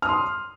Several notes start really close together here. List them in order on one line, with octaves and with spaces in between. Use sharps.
F6 D#6 C6